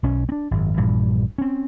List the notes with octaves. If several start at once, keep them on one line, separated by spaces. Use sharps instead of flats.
B1 C#4
C4 D4
G#1 F#2
A#1 G2 A#2 E3
C4 C#4